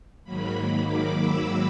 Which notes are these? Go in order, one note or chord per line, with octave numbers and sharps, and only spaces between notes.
G#2 D#3 F#3 A#3 B5
D6
E6